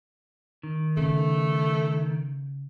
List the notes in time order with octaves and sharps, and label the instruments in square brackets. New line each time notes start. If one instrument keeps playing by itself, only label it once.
[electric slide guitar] D#3
[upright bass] C#3 [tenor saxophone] A3